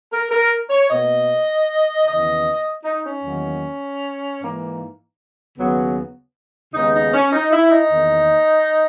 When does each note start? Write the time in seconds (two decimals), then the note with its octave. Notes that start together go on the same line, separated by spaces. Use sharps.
0.12 A#4
0.31 A#4
0.70 C#5
0.90 B2 A#3 D#5
2.06 D#2 C#3 E3 B3 D#5
2.84 D#4
3.04 C#4
3.23 E2 D#3 F#3 A#3
4.40 G#2 E3 A#3
5.57 D#2 C#3 F#3 B3
6.74 D#2 C#3 G#3 B3 D#4
6.93 D#4
7.13 C#4
7.32 D#4
7.52 E4
7.72 D#4
7.90 E2 D#3 A#3